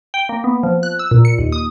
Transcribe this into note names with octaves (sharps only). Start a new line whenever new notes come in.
G5
A#3
B3
F3
F#6
E6
A#2
C#7
D#2
D#6